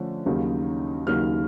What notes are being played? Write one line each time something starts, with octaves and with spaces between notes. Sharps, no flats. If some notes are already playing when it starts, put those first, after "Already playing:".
Already playing: D3 F3 A3 C#4
D#2 C#3 F#3 A#3 D#4
D#2 C#3 F#3 A#3 D#4 F6